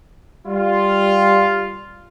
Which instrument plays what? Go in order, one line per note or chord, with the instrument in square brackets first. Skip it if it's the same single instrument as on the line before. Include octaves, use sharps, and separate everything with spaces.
[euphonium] G3 [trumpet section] F4